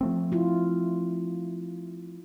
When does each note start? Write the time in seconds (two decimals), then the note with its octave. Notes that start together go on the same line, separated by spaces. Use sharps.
0.01 F3 A3 C4
0.32 E4 F4